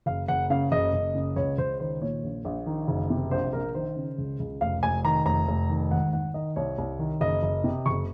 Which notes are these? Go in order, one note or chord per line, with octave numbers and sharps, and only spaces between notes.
F#1 F5
F#1 F#5
C#3 F5
F#1 D#5
F#1
C#3
C#2 C#5
C#2 C5
D#3 C5
A#2 C#5
A#1
A#1
D#3
F#1
C3
A#1 C5
A#1 A#4
D#3 C5
C#3
C#2
C#2
F1 F5
F1 G#5
D#3 A#5
F1 A#5
F1
D#3
G#1 F#5
G#1 F#5
D#3 D#5
C2 C#5
C2
D#3
F#1 D#5
F#1
C3
F#1 C#6